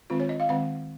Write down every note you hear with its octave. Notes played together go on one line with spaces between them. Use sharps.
D#3 G#3 C4 F4
C#5
D#5
F5
D#3 G#3 C4 F#5